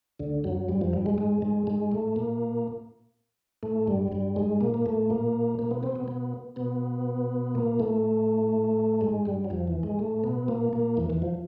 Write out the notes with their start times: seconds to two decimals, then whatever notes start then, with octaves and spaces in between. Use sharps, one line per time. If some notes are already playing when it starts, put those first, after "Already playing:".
0.19 D2 D3
0.44 F#2 F#3
0.68 G2 G3
0.81 F2 F3
0.93 G2 G3
1.06 G#2 G#3
1.18 G#2 G#3
1.42 G#2 G#3
1.67 G#2 G#3
1.91 A2 A3
2.16 A#2 A#3
3.63 A2 A3
3.87 G2 G3
4.12 G2 G3
4.36 G#2 G#3
4.61 A#2 A#3
4.74 A#3
4.86 A2 A3
5.10 A#2 A#3
5.59 A#2 A#3
5.71 B2 B3
5.83 C3 C4
5.96 B2 B3
6.08 B2 B3
6.56 B2 B3
7.55 A#2 A#3
7.79 A2 A3
9.01 G#2 G#3
9.26 G2 G3
9.45 F#3
9.50 F2 F3
9.67 E2 E3
9.83 G#2 G#3
9.99 A2 A3
10.23 B2 B3
10.48 A#2 A#3
10.73 A#2 A#3
10.97 E2 E3
11.10 E2 E3
11.22 F3